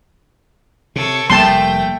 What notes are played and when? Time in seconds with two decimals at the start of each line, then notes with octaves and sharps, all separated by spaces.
0.96 C3 A4 C#5
1.30 F1 G3 A3 A#3 G5 A5 C6